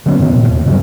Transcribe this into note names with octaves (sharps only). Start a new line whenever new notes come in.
D3 F#3 B3 C#4
F#2 C3 D#3 B3
D1 A#2
D#2
G2 C#3 F#3 G3